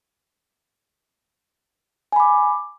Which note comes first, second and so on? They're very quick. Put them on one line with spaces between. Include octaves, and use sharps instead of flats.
G#5 B5 D6